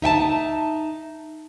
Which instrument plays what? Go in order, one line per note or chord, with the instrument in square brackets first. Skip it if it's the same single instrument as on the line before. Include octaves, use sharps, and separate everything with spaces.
[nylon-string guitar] D#4 E5 G5 A5